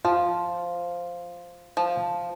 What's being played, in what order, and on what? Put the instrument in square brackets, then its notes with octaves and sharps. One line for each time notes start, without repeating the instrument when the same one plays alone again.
[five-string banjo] F3 [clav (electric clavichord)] F4
[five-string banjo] F3